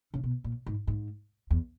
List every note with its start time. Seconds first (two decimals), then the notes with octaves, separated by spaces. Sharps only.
0.14 C#3
0.23 B2
0.44 A#2
0.66 G#2
0.87 G#2
1.51 E2